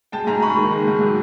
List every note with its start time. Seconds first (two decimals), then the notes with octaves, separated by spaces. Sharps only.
0.12 G#3 G5 A5
0.27 G#2 G#5 A#5
0.42 G#2 B5 C#6
0.57 D#3
0.72 G#3
0.87 G#2
1.01 F#3